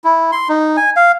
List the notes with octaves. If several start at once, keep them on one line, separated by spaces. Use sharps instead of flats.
E4
C6
D#4
G#5
F5